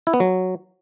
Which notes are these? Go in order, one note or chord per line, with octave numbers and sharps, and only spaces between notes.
E4
B3
F#3